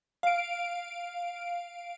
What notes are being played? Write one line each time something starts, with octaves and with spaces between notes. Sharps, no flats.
F5 D7